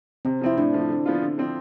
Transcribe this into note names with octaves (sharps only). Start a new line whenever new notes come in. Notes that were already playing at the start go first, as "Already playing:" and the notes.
C3 C4
F3 C4 E4
A2 D4
F3 A3
D3
F3 B3 F4
D3
F3 C4